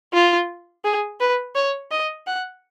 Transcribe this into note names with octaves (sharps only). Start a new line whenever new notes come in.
F4
G#4
B4
C#5
D#5
F#5